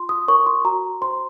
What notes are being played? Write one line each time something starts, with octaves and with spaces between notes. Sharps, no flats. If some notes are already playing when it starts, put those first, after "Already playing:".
Already playing: F4 C6
D#6
A#4 C#5 C#6
C6
F#4 A#5
C5 C6